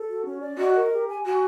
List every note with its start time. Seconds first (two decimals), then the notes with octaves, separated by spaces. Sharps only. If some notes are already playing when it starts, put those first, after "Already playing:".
Already playing: A4
0.08 F#4
0.25 C#4
0.41 D5
0.57 F#4 D#5
0.75 A#4
0.92 G4
1.07 G#5
1.24 F#4 G#5